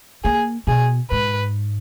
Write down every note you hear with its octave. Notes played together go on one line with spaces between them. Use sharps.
A#3 G#4
B2 G#4
G#2 B4